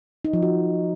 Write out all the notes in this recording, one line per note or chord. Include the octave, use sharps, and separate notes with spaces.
D#4
F3
F#4